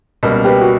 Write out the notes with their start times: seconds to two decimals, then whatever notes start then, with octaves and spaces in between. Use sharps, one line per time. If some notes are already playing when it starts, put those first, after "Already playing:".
0.23 C#2 B2 G3 A#3
0.45 G4 B4
0.61 F#4